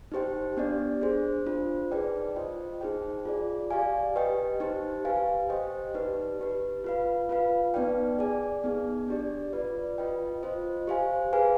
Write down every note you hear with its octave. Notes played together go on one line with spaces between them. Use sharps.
D#4 G4 C5 G5
B3 D4 G4 D5
D4 G#4 C5
D4 F4 C5
D#4 G#4 B4 D5 G5
F4 C5 D#5 G5
D#4 G#4 C5 G5
F4 G#4 D5
G4 D5 F5 G#5
G4 B4 D#5 G5
D#4 G4 C5
G4 B4 F5 G#5
G4 C5 D#5 G5
D#4 G4 B4 D5
D#4 G4 B4
F4 B4 F5
F4 B4 F5
B3 D#4 B4 D5 G5
G#4 D5 G#5
B3 D#4 G#4
D4 G4 D5
F4 B4 D5
F4 B4 D#5 G5
F4 C5 D#5
G4 C5 F5 G#5
G#4 B4 F5 G#5